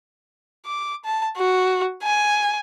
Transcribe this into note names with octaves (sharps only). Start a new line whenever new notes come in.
D6
A5
F#4
G#5